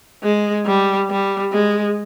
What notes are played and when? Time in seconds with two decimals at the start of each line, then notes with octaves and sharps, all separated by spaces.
0.23 G#3
0.66 G3
1.10 G3
1.52 G#3